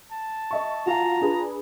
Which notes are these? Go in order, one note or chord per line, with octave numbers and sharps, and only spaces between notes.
A5
D#5 E5 C#6
F4 F#4 F5 G#5 A#5
D4 G#4 B4